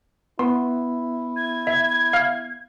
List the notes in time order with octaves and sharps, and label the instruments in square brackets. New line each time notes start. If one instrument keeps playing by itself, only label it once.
[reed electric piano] B3 [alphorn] E4 [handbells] C6
[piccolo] G#6
[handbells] E5
F5 F6